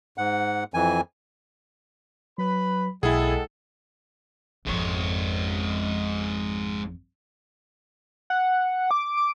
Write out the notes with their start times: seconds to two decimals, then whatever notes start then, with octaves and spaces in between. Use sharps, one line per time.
0.18 G#2 F#5
0.74 F2 E3 G#5
2.38 F#3 B4 B5
3.03 B1 G#3 E4 G#4 A4 F#5 G5
4.66 G#1 F2 G#2 C#5
8.30 F#5
8.91 D6
9.17 D6